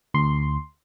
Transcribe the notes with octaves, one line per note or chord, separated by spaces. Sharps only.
D2 C6